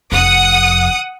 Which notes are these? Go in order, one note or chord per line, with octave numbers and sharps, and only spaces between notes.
F1 F2 F#5 D#6